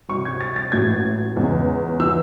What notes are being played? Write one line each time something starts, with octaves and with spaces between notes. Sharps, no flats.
C2 C3 F#3 C#6
G#6
A6
A6
A1 A2 F#3 G#6
E2 C#3 G#3
E3 E6